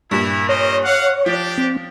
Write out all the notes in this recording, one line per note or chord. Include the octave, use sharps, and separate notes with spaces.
G2 A#2 E4
A#4 C5 C#5 D#5
F5 F#5
F3 D4 G4
C4